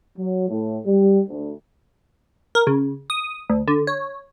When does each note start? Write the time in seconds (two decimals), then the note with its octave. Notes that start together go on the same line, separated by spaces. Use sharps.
0.17 F#3
0.48 A2
0.85 G3
1.28 D2
2.55 A#4
2.67 C#3
3.10 D#6
3.50 D2
3.68 D3
3.87 C#5